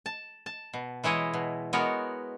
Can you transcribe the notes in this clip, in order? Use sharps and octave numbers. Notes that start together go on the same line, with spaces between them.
A5
A5
B2
E3 G#3 E4 C#5 D#5
B2
G#3 B3 F#4 A#4 C#5